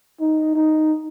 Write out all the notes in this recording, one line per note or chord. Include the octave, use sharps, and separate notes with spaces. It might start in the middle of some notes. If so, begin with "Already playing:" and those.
D#4
D#4